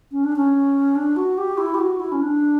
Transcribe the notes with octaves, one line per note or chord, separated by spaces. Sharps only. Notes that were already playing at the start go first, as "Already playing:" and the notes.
C#4
D4
C#4
D4
F#4
G4
E4
G4
F#4
E4
C#4
D4